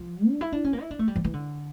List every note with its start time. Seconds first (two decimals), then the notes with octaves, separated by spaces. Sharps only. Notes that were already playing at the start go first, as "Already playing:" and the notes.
Already playing: F3
0.29 D4
0.41 E4
0.52 D4
0.64 C#4
0.73 A#3
0.81 E4
0.91 D4
0.99 A3
1.08 G3
1.16 F3
1.24 E3
1.34 D3